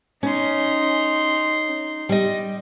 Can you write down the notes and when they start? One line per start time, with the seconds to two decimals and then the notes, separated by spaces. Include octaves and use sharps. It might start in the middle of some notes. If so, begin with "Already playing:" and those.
0.23 C#4 D#4 C6
2.09 G3 D#5